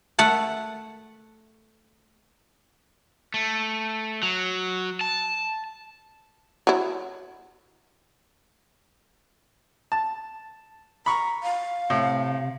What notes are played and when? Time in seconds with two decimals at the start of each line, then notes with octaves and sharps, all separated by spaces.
0.19 A3 F#5 A5
3.34 A3
4.23 F#3
5.01 A5
6.67 F#3 E4
9.92 A5
11.06 A#5 B5 C#6
11.43 F5
11.90 A2 C3